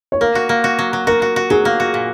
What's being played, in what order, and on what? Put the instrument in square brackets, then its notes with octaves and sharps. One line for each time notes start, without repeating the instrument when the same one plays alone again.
[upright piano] C#5
[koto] A#3 [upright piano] A#4
[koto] F#4
A#3
F#4
F#3
F#3
[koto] F#4 [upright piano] A#4
[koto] F#4
F#4
[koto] F#3 [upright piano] G#4
[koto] A#3
F#4
A#2